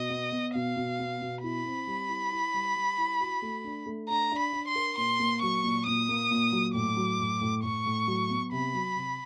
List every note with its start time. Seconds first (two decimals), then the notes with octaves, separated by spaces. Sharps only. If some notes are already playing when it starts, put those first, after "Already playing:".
Already playing: B2 D#5
0.10 B3
0.32 B3
0.55 B2 F5
0.76 B2
0.99 B3
1.22 B2
1.43 E4 B5
1.66 C4
1.87 G3
2.09 E4
2.32 E4
2.54 G3
2.76 G3
2.98 E4
3.20 F#4
3.42 A3
3.64 D4
3.86 A3
4.09 D4 A#5
4.32 D4
4.38 B5
4.53 D4
4.68 C6
4.75 A#4
4.97 A#2 C6
5.19 A#3
5.42 F#3 C#6
5.64 A#2
5.86 A#2 D#6
6.09 A#3
6.31 A#2
6.52 F#3
6.74 A2 D6
6.96 F#3
7.20 A2
7.41 A2
7.63 A2 C#6
7.86 A2
8.07 F#3
8.30 B3
8.52 C3 B5
8.74 F#3
8.96 C3